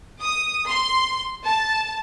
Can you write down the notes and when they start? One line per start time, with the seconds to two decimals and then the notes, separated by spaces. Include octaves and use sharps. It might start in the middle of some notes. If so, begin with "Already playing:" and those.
0.20 D#6
0.68 C6
1.45 A5